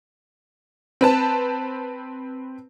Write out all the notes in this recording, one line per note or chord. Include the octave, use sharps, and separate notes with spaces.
C4 B4 A5